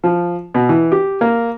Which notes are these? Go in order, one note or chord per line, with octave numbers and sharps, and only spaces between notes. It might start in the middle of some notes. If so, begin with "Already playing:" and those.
F3
B2
E3
G4
A#3